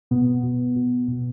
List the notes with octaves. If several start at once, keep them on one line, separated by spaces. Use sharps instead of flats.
B2 B3
B2
B2
B2